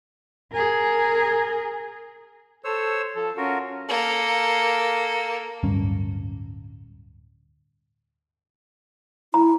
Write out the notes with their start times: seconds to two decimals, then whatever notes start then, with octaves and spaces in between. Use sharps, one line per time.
0.52 G#4 A#4
2.64 A4 C5 C#5 E6
3.16 F3 A4
3.37 C#4 F4 F#4 A#4
3.89 A#3 A4
5.63 D1 G2 C#4
9.34 E4 A#5